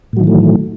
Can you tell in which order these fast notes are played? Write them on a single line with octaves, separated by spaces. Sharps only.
A2 F#3 D#3 E3 A3